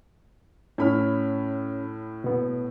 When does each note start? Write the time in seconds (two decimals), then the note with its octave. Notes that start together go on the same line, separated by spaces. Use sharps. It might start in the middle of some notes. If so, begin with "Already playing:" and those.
0.78 A2 C#4 C#5 B5 F6
2.24 B2 B3